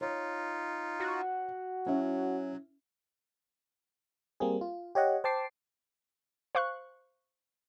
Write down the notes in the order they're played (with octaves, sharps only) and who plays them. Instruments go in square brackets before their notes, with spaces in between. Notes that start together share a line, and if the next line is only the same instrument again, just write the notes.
[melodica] D#4 F4 [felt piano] C#5
[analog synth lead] F#4
[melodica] F#3 [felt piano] C#4 E4 E5
[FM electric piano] G3 A#3 C4 G#4
F4
G4 C#5 D#5 F#5
C5 G5 A5 D6 C7
[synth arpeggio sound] C5 F5 C#6 F#6